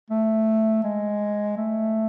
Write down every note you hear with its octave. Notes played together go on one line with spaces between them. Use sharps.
A3
G#3
A3